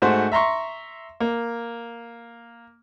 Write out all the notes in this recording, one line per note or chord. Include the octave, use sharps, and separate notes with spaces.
G#2 A3 F#4 C5
E5 A#5 C6 C#6
A#3